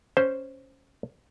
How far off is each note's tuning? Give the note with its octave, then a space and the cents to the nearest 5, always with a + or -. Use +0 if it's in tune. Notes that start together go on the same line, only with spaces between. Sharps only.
C#4 +0 C5 +0